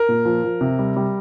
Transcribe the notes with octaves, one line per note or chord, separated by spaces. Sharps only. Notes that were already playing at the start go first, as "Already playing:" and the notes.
Already playing: A#4
A#2
F3
F3
C3
G3
G3